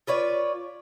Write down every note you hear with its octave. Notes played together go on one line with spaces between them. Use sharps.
F4 B4 C#5 D5